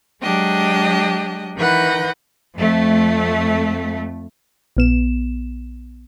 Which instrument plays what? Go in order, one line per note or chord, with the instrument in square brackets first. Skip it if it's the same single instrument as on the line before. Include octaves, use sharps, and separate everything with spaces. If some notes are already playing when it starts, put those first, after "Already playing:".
[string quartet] F#3 G#3 D4 G4 D#5
D#3 E3 B4 F#5 G6 A#6
[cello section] F2 A3
[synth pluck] A#1 B3 E7